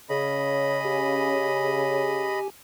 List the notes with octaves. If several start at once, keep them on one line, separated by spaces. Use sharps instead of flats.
C#3 D#5 B5
G4 G#5